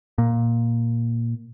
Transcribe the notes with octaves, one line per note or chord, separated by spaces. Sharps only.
A#2